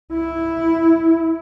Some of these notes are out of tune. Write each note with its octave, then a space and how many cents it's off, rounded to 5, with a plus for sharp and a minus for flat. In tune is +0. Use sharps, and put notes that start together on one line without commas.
E4 -5